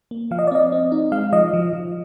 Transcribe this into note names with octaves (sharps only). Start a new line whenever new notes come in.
A#3
F3 F5
D#5
D5
C4 D#5
C4
D#4
G#3 F5
F3 D#5
F3
F3